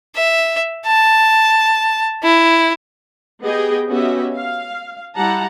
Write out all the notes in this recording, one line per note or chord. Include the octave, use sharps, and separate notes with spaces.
E5
A5
E4
B3 G4 G#4 D#5 G5
B3 C#4 F#4 G4 D#5 E5
F5
G3 E4 G4 F#5 A5 A#5